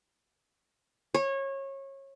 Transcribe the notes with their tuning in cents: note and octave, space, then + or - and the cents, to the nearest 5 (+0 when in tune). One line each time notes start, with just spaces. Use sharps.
C#5 -25